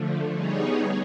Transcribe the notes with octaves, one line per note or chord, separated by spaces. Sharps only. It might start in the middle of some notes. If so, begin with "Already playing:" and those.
Already playing: D3 F3 A3
G3 B3 D#4 G#4 C#5